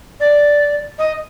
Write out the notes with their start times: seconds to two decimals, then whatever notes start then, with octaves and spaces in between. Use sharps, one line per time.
0.20 D5
0.99 D#5